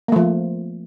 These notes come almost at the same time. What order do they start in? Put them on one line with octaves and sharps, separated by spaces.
A#3 A3 F3